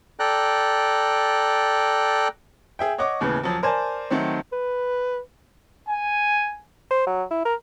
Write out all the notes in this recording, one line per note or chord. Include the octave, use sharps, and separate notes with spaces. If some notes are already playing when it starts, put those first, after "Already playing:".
A4 D5 G5 A#5 F#6
G#4 E5 G5
C#5 D#5 F#5 C#6 D6
D#2 A2 C#3 E3 B3
D#1 F3 F#3
A#4 C5 D5 G#5 A5
D#3 F#3 A3 C4
B4
G#5
C5
F#3
E4
A#4